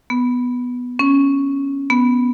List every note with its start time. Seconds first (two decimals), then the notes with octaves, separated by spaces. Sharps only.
0.10 B3
0.99 C#4
1.90 B3